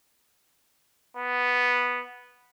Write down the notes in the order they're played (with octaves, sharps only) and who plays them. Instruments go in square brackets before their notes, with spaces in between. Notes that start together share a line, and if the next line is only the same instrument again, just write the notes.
[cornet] B3